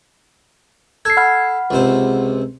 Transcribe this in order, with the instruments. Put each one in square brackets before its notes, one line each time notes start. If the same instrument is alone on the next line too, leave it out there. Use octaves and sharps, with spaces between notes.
[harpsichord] A4 [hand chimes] G#6 C7
[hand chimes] F#5 B5 F6
[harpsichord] C#2 C3 C5